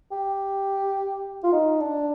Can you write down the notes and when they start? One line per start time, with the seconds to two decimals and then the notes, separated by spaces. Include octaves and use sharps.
0.12 G4
1.44 F4
1.52 D#4
1.80 D4